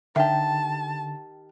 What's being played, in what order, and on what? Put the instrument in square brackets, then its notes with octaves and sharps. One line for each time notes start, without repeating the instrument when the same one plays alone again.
[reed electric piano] D3 [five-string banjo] D#3 G4 [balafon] E5 [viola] A5